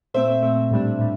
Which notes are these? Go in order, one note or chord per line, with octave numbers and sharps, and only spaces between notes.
A#2 A3 C4 C5 E5
A#2 A3 C4
A2 G3 D4
A2 G3